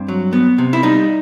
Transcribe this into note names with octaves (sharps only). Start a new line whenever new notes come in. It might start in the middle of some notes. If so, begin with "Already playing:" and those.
Already playing: G2 C4
F#3
B3
C3
E4
G3 D#4